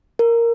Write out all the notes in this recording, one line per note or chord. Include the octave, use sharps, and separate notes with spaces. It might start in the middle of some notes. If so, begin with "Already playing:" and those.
A#4